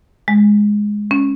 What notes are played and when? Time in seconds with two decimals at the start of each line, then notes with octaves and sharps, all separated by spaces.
0.28 G#3
1.11 C#4